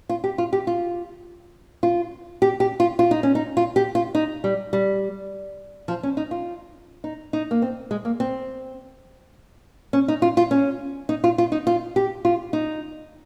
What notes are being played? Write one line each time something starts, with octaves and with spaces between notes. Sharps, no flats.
F4
G4
F4
G4
F4
F4
G4
G4
F4
F4
D#4
C#4
D#4
F4
G4
F4
D#4
G3
G3
F3
C#4
D#4
F4
D#4
D#4
A#3
C4
G#3
A#3
C4
C#4
D#4
F4
F4
C#4
D#4
F4
F4
D#4
F4
G4
F4
D#4